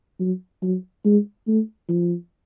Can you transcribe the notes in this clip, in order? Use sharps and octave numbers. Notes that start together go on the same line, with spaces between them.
F#3
F#3
G#3
A3
F3